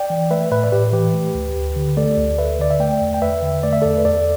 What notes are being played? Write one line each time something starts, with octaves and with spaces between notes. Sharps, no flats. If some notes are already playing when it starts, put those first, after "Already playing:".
Already playing: D5 G5
E3
A3 B4 E5
A2 B4 E5
D5
A2 G4 B4
E3 G4 B4
A3
D2
D2
D3
A3 A4 D5
D2
D2 B4 E5
D3 D5
E5
A3 D5 G5
E2
G5
E2 B4 E5
D3
A3 D5
E5
E2 A4 D5
B4
E2 A4 D5